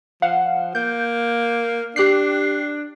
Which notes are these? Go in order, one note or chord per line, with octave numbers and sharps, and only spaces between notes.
F3 F5 F#5
A#3 G6
D4 G4 F#6 C7